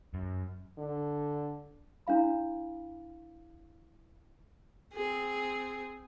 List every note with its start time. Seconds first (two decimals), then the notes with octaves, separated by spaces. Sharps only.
0.14 F#2
0.78 D3
2.07 D4 E4 F5 B5
4.93 C4 G#4